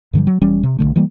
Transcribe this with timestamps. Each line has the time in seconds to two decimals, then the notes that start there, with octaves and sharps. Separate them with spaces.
0.13 G2 D3 F3 G3
0.27 F#3
0.42 E1 E3 G3 C#4
0.63 C3
0.79 B1 F#2 D3 A3
0.96 E3 G3 A#3